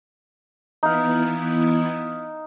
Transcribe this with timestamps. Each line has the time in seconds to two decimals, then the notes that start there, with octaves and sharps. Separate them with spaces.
0.83 E3 B3 D#4 E4 F5